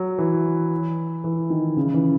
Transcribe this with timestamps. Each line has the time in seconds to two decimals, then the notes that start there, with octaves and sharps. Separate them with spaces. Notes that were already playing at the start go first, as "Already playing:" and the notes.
Already playing: F#3
0.18 E3
1.24 E3
1.50 D#3
1.77 C#3
1.94 E3